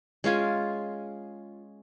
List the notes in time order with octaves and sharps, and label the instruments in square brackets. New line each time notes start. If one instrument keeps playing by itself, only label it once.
[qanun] G#3 C#4 F4 G#5